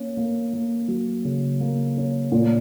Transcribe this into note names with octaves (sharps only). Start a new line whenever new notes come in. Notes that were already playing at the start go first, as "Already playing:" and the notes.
Already playing: A#3 C#4
A#3
A#3
F#3
C#3
A#3
C#4
A#2